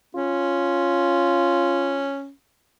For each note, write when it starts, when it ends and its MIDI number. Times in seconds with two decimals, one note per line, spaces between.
0.15 2.31 61
0.15 2.16 65